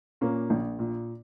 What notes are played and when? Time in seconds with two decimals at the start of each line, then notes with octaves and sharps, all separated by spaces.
0.21 A#2 A#3 C#4
0.50 A#1
0.79 A#2